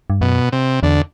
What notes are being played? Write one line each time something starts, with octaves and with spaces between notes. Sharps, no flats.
G2
F#2 B2
C3
E2 D3